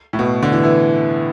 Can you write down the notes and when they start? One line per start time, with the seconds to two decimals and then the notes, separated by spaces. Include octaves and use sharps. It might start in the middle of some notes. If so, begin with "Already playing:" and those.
0.13 A2
0.19 B2
0.43 D3
0.52 E3
0.64 E3